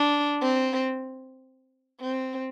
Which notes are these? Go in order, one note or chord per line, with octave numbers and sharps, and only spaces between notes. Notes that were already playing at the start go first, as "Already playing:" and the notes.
Already playing: D4
C4
C4